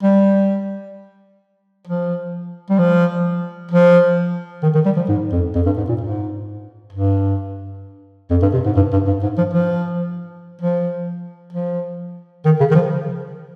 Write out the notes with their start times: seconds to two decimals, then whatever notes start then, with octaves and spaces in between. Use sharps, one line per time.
0.03 G3
1.87 F3
2.70 G3
2.79 F3
3.71 F3
4.63 D#3
4.75 D#3
4.86 G3
4.97 F3
5.09 G#2
5.32 F2
5.55 F2
5.66 G2
5.77 G#2
5.89 A#2
6.01 G#2
6.93 G2
8.31 F2
8.42 G2
8.54 C3
8.66 G#2
8.77 G2
8.93 G2
9.07 G2
9.23 G#2
9.38 F3
9.54 F3
10.62 F3
11.53 F3
12.46 D#3
12.60 C#3
12.71 D#3
12.75 F3